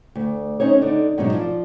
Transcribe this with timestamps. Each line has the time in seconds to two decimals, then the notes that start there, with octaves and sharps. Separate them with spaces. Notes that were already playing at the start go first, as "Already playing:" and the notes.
0.15 D2
0.60 C#4 D#4 C5 C#5
0.81 D3 D4 D#4
1.18 G#2 B2 D3 F#3 D4 D#4
1.32 F3 D5